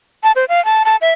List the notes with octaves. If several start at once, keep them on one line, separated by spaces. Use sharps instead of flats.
A5
C5
F5
A5
A5
E5